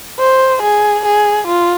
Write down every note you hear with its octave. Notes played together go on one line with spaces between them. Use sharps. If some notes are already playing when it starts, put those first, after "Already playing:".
C5
G#4
G#4
F4